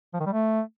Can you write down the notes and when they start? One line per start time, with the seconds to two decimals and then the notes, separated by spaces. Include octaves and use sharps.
0.14 F3
0.20 D#3
0.26 G3
0.32 A3